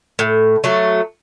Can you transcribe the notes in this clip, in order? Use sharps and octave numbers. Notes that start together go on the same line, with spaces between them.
A2
F#3 A3